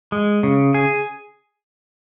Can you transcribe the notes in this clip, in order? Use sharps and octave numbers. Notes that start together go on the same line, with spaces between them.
G#3
C#3
G#4